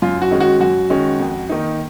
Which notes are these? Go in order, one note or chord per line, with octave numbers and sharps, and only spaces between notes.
F#2 F4
F#4
D#3 G#3 C#4
F#4
F#2 F#4
D#3 G#3 C#4
F2
D#3 A#3 D#4